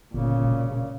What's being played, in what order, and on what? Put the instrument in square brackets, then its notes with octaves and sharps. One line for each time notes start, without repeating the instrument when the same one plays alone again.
[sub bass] G1 [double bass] A#2 C#3
[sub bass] E1